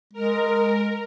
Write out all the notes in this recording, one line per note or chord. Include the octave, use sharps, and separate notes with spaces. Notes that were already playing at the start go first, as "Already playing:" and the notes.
G#3 A#4